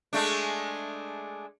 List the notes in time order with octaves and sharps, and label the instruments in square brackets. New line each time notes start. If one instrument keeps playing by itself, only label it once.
[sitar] G#3 A3 D4